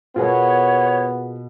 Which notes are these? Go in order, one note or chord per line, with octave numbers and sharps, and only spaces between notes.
B2 A#3 B3 F4 G#4 C#5